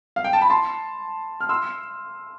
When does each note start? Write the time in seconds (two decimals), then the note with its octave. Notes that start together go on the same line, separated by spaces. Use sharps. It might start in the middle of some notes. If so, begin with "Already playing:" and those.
0.16 F5
0.24 G5
0.33 A5
0.41 B5
0.50 A5 C6
1.41 F6
1.49 C6 E6